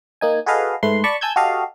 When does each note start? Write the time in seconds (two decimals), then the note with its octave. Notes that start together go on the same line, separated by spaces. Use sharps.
0.21 A#3 D#4 G#5
0.46 F#4 G#4 A4 B4 D#5 F5
0.83 G#2 A3 B4 C6
1.04 D5 A5 B5 C#6
1.21 G#5 A5 E6 G6 G#6
1.36 F#4 G4 A4 D#5 F5